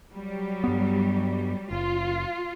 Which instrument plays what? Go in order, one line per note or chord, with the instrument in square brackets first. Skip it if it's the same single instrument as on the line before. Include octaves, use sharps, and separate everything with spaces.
[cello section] F#3 G3
[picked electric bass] G2 B3
[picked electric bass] F#1 [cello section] F4